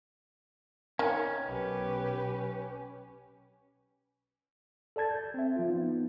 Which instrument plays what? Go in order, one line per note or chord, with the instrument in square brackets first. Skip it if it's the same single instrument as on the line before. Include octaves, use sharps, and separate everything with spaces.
[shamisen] D#3 [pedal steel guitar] C#4
[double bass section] B1 [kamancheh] G4 B4
[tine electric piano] A4 D5 A5 G#6 A6
G6
C4 E5
F3 F4
B3 D#4